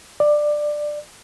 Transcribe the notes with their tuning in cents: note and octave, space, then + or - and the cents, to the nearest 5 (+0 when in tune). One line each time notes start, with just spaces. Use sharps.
D5 +15